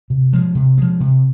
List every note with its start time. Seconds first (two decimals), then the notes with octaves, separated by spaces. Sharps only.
0.10 C3
0.33 F3 G#3
0.55 C3
0.78 F3 G#3
1.00 C3